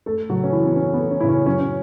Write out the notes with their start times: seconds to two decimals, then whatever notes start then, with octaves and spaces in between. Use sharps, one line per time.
0.06 A3 A4
0.29 C#3 F#3 F#4
0.44 C#4
0.52 C#3 E3 E4
0.66 B3
0.76 A3 C#4
0.93 B3
1.00 A3
1.11 C#4
1.20 C#3 E4
1.29 C#4
1.46 F#3 C#4
1.61 C#4